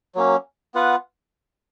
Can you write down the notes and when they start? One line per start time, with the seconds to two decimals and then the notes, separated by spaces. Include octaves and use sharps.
0.15 F#3 A#3 C#4
0.75 B3 F4 B4 F#5